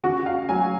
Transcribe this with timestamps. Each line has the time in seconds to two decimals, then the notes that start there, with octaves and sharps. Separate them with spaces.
0.03 C#3 F#4
0.26 F5
0.49 F#3 G#5